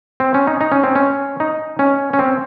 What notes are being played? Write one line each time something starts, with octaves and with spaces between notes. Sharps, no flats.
C4
C#4
D#4
D#4
C#4
C4
C#4
D#4
C#4
C#4
C4